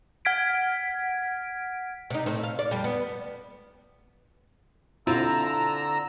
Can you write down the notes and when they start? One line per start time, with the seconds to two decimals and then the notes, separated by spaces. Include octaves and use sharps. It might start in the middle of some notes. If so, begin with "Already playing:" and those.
0.25 F#5 F6 G#6 B6 D7
2.10 C3 D#4
2.26 A2 C4
2.43 F5
2.59 D5
2.71 F2 G3
2.84 B3
5.07 D3 C4 E4 F4 A#5 E6